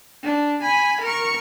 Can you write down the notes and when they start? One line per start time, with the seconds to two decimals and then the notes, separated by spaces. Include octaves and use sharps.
0.23 D4
0.62 G#5 B5
1.01 A#4 C#6